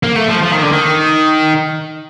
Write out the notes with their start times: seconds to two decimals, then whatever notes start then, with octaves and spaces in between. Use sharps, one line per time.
0.03 A#3
0.16 A3
0.29 F3
0.43 F3
0.52 D#3
0.63 D3
0.72 D#3